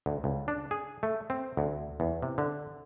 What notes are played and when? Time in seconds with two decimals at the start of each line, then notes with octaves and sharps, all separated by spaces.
0.06 D2
0.24 C#2
0.48 D4
0.71 G#4
1.03 A3
1.30 C4
1.57 D2
2.00 E2
2.22 C3
2.38 D3